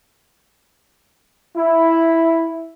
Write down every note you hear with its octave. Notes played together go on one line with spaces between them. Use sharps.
E4